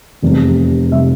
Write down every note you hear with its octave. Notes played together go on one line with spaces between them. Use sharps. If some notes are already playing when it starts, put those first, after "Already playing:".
F1 E2 C3 G3
C3 G3 E5